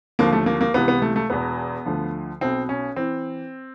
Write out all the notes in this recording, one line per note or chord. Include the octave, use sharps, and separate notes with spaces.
D#2 D3 F3 A#3
A3
A#3
A#3
C#2 C3 E3 B3
B3
A3
A3
E1 E2 B2 B3
D2 D3 F3
B1 B2 C4
C#4
E3 C4